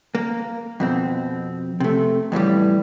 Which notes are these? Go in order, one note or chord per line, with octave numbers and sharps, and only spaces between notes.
A#3
F2 B2 C4
C3 A3
F2 A2 E3 G3